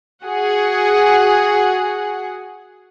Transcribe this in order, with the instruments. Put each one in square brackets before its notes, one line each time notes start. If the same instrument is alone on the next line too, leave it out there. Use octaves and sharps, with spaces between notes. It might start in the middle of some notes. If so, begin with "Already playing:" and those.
[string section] F#4 G#4 F#5